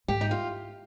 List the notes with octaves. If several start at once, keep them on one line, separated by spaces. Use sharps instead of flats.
G#2 G4
D#4
F4